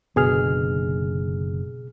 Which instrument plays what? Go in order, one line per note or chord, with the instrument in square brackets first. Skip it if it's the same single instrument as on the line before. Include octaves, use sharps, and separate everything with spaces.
[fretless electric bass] F#1 D3 [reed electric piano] B2 G#4 F6